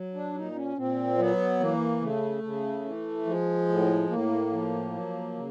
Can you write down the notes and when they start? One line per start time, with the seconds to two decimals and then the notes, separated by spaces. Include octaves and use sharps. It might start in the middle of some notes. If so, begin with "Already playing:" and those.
Already playing: F#3
0.14 D4
0.34 A#2 D#4
0.55 C#4
0.77 A#2 C4
1.18 F#3 B3
1.60 E3 A#3
2.01 C#3 A3
2.43 C#3
2.85 E3
3.26 F3 G#3
3.68 A2
4.09 A2 A#3
4.51 F3
4.93 F#3
5.35 C#3